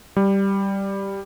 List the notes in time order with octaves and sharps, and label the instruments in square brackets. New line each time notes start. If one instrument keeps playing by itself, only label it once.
[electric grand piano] G3